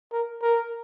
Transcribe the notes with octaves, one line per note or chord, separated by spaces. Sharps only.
A#4
A#4